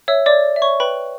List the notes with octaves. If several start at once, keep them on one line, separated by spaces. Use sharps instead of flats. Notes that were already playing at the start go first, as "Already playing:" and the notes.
C#5 E5 E6
D5 D6
C#5
E5
C#5 C#6
B4 G5 B5